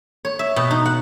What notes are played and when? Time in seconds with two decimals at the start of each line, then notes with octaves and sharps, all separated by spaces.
0.25 C#5
0.39 E5
0.56 B2
0.71 D#4
0.85 F#5